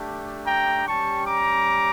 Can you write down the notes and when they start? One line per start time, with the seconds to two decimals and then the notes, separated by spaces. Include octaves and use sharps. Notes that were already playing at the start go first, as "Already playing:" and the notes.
Already playing: A3 D4 G4
0.46 G5 A#5
0.87 G3 C#4 G4 A5 C#6
1.27 A#5 D6